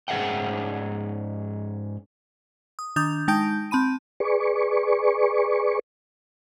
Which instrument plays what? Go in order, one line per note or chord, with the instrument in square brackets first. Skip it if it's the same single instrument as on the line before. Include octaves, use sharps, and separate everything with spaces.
[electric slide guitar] G#2 C#4 G#4 E5 F#5 G5
[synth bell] D#6
D#3 D4 D#6 G6 F7
G#3 D#4 G5 A5 G6 D7
C4 A5 B5 D#7
[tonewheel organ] G#4 B4 D5 C#6